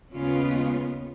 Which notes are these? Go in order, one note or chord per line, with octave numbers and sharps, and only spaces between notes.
D#2 C#3 G#3 B3 C#4 F4